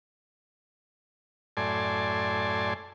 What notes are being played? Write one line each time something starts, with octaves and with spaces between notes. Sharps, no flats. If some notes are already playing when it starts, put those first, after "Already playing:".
F#2 A2 D5 G#5 A5 C6